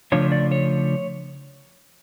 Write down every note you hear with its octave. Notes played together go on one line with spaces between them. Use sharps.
C#3 F3 A3 D4 F4 C#5
D5
C#5